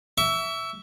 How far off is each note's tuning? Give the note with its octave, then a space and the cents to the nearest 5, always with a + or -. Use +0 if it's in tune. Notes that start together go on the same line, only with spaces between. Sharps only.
E5 +0 C#6 +40